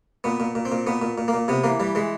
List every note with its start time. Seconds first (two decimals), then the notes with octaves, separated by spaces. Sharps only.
0.24 A#2 B3
0.40 A#2
0.55 A#2
0.65 C4
0.72 A#2
0.87 A#2 B3
1.02 A#2
1.18 A#2
1.28 A#3
1.34 A#2
1.48 C3 B3
1.64 E3 A#3
1.80 E3 G3
1.95 E3 G#3